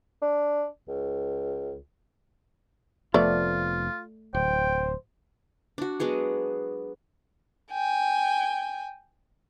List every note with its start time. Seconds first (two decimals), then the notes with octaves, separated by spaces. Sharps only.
0.22 D4
0.88 C#2
3.14 F1 F3 A3 B3 F4 D5
4.35 D1 C5 G5
5.78 D4 F#4
6.00 F#3 G#3 B3 G#4
7.71 G5 G#5